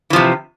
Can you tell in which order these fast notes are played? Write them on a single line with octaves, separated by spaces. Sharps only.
E3 F3 C3